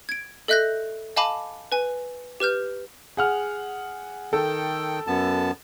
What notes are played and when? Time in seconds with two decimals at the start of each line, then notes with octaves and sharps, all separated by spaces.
0.09 G#6 D7
0.48 A4 D#5 E5 F#6 G6 A#6
1.16 D#5 F5 G#5 A5 B5 D6
1.72 B4 G#5
2.40 G4 B4 F6 G6
3.17 G#4 F#5 F6
4.33 D#3 A4 G5
5.07 F#2 B3 A5